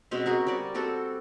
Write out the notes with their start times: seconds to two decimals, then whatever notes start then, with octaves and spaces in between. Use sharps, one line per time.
0.11 B2 G#3 C4 C#4
0.26 F#4 G#4 A#4
0.47 G3 C#5 D5
0.74 G3 C4 F#4 A4